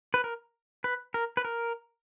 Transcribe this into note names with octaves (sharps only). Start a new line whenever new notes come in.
B4
A#4
B4
A#4
B4
A#4